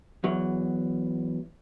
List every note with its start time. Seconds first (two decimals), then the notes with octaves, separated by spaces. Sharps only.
0.24 E2 F#3